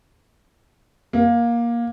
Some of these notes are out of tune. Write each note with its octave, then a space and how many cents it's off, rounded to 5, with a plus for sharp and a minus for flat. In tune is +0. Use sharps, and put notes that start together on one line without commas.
A#3 +15